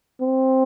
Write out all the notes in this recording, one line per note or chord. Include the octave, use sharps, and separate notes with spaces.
C4